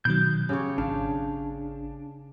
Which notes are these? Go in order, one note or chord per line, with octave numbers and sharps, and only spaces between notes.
B2 D#3 F#3 G6
C#3 G4 C#5
G#1 D4 F5